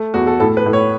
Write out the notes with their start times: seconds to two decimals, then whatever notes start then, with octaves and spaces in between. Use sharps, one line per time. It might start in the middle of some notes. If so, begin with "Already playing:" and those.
Already playing: A3
0.14 E2 F#4
0.27 A4
0.40 A2 A4
0.57 B4
0.66 A2
0.73 C#5